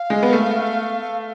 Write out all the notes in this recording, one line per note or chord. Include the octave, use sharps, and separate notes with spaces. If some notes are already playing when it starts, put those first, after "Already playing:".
Already playing: F5
G#3
B3
A3